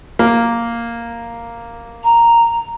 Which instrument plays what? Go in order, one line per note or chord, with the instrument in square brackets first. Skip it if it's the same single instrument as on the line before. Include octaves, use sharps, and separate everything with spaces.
[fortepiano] A#3
[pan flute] A#5